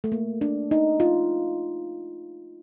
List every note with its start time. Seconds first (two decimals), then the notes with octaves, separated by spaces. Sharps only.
0.04 A3
0.12 A#3
0.41 D4
0.71 D#4
1.00 F4